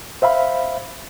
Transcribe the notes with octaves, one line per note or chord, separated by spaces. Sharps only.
C5 E5 F5 B5